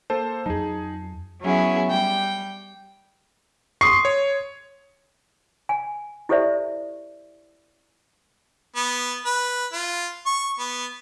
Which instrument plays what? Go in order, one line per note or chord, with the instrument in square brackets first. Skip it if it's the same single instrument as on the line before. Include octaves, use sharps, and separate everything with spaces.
[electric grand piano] A#3 A4 C5 [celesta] A5
[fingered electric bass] F2 F#3 [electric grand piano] D#4 G#4 [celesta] A5
[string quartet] F#3 B3 C#4 E4 G#4
G3 G5
[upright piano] C6 D#6 C7 [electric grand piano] C#6
[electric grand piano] C#5
[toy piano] G#5
E4 G4 A4 C5 D5 E5
[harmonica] B3
B4
F4
C#6
B3